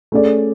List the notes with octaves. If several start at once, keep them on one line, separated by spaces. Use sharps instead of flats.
A3 C#4 G#4 D5